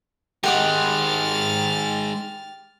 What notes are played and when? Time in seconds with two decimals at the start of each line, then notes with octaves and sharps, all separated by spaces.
0.44 D#3 G#3 G4 F#5 D6 F6 A6